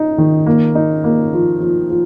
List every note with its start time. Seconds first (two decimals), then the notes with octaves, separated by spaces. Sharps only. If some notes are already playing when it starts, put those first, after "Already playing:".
Already playing: D#4
0.18 D#3
0.46 A#3
0.75 D#4
1.04 A#3
1.33 F3
1.61 F3
1.90 F3